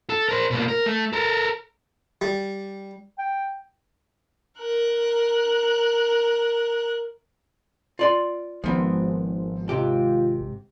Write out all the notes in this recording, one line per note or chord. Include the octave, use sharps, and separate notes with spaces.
A4
A#4 C5
B2 A#3
A#4
A3
A4 A#4
G3
G5
A#4 F#6
F4 D5 C6
G#1 F3 B3 C4
G#2 C3 F4 G4